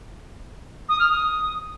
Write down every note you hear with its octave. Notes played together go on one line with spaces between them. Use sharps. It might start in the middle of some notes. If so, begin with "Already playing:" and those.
D#6
F6
D#6